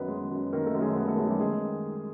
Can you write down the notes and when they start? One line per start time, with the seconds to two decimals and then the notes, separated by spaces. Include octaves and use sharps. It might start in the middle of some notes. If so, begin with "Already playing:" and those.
Already playing: F#2 D#3 B3 B4
0.08 G#3
0.31 F#2
0.53 D#3 A#3 A#4
0.66 A3 A4
0.75 F#2
0.81 G#3 G#4
0.96 G#3 B3 B4
1.07 A3 A4
1.18 F#2 G#3 G#4
1.30 G3 G4
1.40 D#3 G#3 G#4